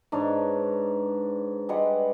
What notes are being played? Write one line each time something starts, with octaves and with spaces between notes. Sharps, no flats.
G#2 D4 B4 C#5
G3 G#3 B4 F#5